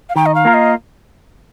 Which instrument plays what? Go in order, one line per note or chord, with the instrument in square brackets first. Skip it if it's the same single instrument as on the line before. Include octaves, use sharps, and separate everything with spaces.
[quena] F5
[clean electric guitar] D#3 [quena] G5
[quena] D#5
F5
[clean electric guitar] A#3 F4 A#4
[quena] D#5